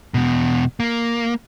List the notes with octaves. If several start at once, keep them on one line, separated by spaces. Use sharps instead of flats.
E2 B2
A#3